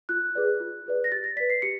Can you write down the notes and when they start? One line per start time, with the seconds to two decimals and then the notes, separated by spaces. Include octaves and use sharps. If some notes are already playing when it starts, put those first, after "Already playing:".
0.09 F4 F#6
0.35 G#4 B4 D5
0.60 F4
0.86 G#4 B4 D5
1.04 A#6
1.12 G4 A6
1.24 A#6
1.36 B4 D5 B6
1.50 C7
1.62 G4 C#7